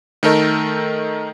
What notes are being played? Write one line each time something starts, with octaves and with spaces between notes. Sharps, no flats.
D#3 A3 D#4 A4 A#4 D#5